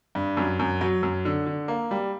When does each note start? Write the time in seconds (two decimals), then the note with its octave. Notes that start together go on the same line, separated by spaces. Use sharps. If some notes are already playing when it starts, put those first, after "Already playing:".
0.15 G2
0.37 F#2
0.59 F#2
0.81 F#3
1.03 F#2
1.25 D3
1.46 D3
1.68 A#3
1.91 G3